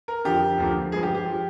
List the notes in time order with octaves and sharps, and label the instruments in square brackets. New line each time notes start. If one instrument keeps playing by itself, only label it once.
[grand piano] A#4
F2 D3 F3 G4
D2 D3 F3 A#3
G2 F3 G#3 G#4
G4
G4
F3